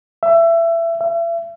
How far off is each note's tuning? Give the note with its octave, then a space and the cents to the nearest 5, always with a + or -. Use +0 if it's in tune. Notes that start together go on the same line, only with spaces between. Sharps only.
E5 +25
E5 +40